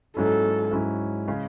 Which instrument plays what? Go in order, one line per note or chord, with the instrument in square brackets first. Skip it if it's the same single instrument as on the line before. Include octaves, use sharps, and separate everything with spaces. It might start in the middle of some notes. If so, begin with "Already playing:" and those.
[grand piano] G#2 F#3 C#4 E4 [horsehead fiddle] A4
[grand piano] G#2 F#3 C#4 E4
C#3 G#3 C#4